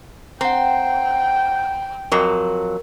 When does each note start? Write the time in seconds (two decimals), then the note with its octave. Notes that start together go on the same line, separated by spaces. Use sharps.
0.41 C4 F#5 G5 A#5
2.12 F2 F#3 A#4